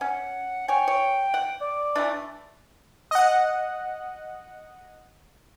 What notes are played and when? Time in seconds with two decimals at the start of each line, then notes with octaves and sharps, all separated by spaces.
0.01 C#4 F#5
0.68 C#5 G5 G#5
0.88 C#5
1.34 F#5
1.61 D5
1.95 E3 A3 D4
3.11 D#5 F#5